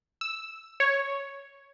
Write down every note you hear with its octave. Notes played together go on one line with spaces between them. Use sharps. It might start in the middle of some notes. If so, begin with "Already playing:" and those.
E6
C#5